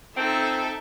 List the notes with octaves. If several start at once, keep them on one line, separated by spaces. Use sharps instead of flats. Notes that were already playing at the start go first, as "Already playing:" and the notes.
F2 C4 D#4 A4 E5